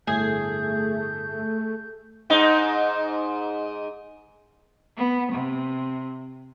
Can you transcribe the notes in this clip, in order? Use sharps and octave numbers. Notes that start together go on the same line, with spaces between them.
G1 A2 A3 G#4 G6
G#2 D#4
B3
C3